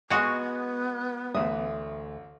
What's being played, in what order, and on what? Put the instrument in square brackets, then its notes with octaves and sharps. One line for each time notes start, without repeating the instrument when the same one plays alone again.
[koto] G#3 F#4 [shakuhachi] B3 [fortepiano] G#5 C#6 D#6
[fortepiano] A1 D#6 [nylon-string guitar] D2 E5